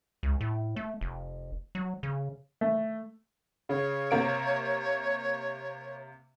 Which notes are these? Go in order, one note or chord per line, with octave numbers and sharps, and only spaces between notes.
C#2
A2
A3
F1
F#3
C#3
A3
C#3 C#5
C3 A#3 D7